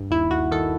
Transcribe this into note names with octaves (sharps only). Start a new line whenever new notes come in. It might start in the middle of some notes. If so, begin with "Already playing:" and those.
Already playing: G2
D#2 E4
D#2 F#4
D#3 A4